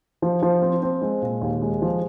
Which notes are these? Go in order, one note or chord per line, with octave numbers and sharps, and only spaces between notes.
F3
F3
C4
C4
G#3
A#2
D#2
G#3
F3